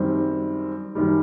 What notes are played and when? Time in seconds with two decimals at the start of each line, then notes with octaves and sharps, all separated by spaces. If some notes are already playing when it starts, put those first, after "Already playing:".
Already playing: F#2 D#3 G3 C4
0.95 F#2 D#3 G3